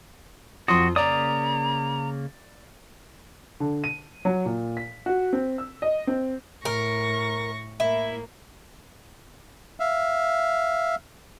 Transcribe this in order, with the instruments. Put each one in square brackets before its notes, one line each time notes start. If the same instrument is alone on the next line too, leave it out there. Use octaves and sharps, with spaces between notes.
[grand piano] F2 C6 D#6 [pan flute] F4 [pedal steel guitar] F#4
[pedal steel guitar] C#3 A#3 D#6 [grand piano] D5 [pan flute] A#5
[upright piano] D3
D#7
F#3
A#2
B6
F#4
C4
E6
D#5
C4
[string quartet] A2 C#6 A#6 [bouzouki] A#4
[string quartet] A2 A#3 [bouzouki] E4
[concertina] E5 F5